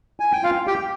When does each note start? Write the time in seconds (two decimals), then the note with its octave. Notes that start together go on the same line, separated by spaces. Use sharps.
0.20 G#5
0.32 G5
0.43 F4 F5
0.67 G4 G5